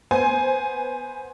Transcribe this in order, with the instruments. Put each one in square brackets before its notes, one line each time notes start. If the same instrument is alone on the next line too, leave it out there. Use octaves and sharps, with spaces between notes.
[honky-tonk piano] B3 C5 G#5